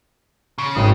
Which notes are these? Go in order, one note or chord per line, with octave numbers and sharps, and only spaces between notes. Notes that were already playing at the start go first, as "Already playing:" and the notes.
C#3
G#1 D#6